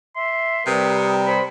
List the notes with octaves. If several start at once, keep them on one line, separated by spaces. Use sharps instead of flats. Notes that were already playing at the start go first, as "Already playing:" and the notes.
E5 C6
C3 G3 A#4 B4 D#6
C5 B5